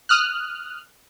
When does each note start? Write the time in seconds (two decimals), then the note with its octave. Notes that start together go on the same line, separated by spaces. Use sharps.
0.09 D#6 F6 F#6